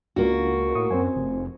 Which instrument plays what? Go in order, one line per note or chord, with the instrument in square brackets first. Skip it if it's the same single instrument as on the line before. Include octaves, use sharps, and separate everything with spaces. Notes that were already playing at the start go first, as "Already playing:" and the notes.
[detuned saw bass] C#2 [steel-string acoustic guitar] A#3 F#4 [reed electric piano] D4 F4
[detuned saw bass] C#2
[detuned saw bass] A2 [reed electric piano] C#6 D#6
[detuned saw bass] F#2 [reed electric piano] C4 C5 G#5
[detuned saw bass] F1